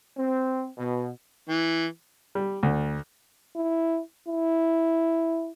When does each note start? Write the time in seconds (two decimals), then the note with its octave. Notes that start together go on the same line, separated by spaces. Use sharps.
0.17 C4
0.78 B2
1.49 E3
2.35 G3
2.63 D2
3.56 E4
4.28 E4